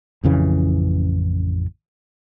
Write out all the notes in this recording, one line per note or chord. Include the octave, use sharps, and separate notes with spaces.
A1 F2 C#3 E3